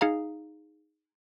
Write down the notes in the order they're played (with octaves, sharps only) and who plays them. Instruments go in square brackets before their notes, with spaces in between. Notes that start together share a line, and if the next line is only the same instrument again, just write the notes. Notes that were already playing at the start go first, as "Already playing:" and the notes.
[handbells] D#4 G#4 F5 A#5